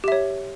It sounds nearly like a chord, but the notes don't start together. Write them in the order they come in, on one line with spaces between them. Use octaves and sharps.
G4 E5 C#5